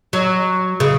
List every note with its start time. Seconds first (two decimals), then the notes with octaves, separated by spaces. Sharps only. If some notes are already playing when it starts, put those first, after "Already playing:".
0.13 F#3
0.80 C#3